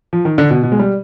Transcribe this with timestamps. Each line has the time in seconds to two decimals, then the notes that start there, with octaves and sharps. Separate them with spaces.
0.13 F3
0.25 D#3
0.38 D3
0.50 B2
0.63 B2
0.72 G#3
0.79 G3